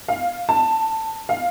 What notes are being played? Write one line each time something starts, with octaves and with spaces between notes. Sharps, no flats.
F5
A5
F5